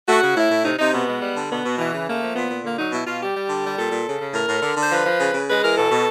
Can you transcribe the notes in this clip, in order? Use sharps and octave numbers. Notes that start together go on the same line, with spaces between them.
A3 F#4
C#3
A2 E4
A2
C3 D#4
C3 D#4
B2 B3
G#3
G3
D3
B2 B3
B2
E3
C#3
A3 A#3
F3
A#2 B3
A#2
D3 A#3
F#3 D#4
B2 E4
B2 F4
G3 G4
G3
D3
G3
A#2 A4
A#2
C#3
C#3
A2 A#4
A2
D3
D3 C5
F3 B4
F3
C#3
C#3
G#3 B4
E3 A#4
B2 A4
B2